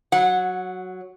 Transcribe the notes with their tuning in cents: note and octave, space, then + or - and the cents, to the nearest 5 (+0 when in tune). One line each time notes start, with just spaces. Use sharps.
F#3 +0 F#5 -20